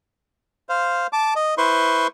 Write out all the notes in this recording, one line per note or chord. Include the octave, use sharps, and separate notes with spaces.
C5 F5
A5 D6
D#5
E4 B4 C5 C6 C#6